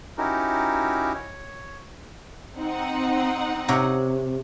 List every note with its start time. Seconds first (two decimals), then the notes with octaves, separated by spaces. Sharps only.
0.18 C#4 D#4 E4 F#4 G4 A#4
1.14 C#5
2.57 C4 D#4 F#5
3.68 C3 C#5 A#5